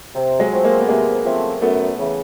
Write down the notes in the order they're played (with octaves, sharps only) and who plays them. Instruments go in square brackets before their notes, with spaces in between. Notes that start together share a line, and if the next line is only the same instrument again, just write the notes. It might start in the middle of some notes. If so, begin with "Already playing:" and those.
[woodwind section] C3
[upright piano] F#3 G#3
[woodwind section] F3 A3 C4
[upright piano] G#3 A#3
B3
[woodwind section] C3 [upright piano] G#3 A#3
[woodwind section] F3 A3 C4
[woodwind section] F#2 [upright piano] A3 B3
[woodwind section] C#3 E3